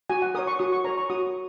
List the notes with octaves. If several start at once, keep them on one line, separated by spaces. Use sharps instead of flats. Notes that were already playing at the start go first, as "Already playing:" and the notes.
F#4 G#5
F#5
A#4 C#5 D#6
C#6
F#4 D#6
C#6
A#4 C#5 A#5
C#6
F#4 D#6